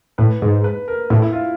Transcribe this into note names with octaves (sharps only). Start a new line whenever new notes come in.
A2 B4
G#2
B4
A#4
A2 E4
E4
F4